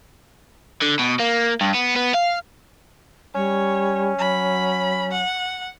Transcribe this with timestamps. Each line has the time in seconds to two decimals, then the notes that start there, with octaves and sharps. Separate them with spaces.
0.82 D3
0.99 B2
1.19 A#3
1.61 G2
1.74 B3
1.96 B3
2.15 F5
3.35 G3 C#4 C#5
4.18 F#3 B5
5.11 F#5